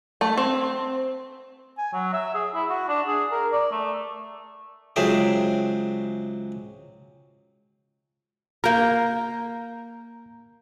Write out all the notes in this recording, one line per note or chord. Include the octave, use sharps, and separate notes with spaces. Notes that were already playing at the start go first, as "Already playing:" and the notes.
A3
C4
G#5
F#3
E5
G#4
E4
F#4
D4
G#4
A#4
D5
A3
C#2 F#3 C4 G#4 E5 G5
A#3 A#4 A#5 G6